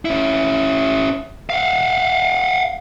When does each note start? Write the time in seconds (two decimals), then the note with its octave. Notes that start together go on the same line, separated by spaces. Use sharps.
0.05 C#4 E4
1.50 F5 F#5